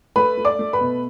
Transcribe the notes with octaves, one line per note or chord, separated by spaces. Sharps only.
A3 B4 B5
A3
D5 D6
A3
B4 B5
B2